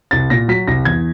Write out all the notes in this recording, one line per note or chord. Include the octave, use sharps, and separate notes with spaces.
C2 A6
A#2 A#6
F#3 B6
C2 A#6
E2 G#6